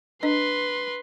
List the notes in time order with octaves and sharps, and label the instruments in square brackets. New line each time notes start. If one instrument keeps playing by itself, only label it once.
[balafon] D4 D#5 [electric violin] B4 C6